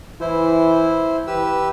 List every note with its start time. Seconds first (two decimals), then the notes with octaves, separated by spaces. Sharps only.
0.21 E3 E4 C5
1.27 E3 G4 B4 E6